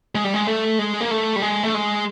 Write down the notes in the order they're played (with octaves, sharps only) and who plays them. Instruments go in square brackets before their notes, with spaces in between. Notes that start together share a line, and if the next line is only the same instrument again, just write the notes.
[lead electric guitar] G#3
G3
G#3
A3
G#3
A#3
A3
G3
G#3
A3
G#3